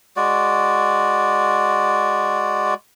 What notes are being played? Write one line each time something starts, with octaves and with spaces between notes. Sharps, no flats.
G#3 F#4 D5